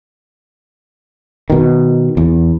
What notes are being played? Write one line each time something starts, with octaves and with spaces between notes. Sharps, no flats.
B2 D#3
E2